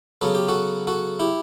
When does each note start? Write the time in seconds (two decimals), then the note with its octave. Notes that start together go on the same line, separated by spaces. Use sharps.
0.21 C#3 F#3 B3 A4
0.35 G4
0.48 F#4 A4
0.87 F#4 A4
1.20 E4 G4